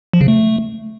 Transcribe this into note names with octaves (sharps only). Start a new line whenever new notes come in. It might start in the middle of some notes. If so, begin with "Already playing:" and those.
F3
C#3
A3